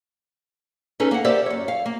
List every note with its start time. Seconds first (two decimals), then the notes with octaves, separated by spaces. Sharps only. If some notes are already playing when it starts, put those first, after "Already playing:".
1.00 C#4 D#4 G#4 A4 B4
1.11 A#3 F#5
1.24 G4 A#4 C5 D5 E5
1.46 F#2 C#5
1.68 F5
1.86 A#3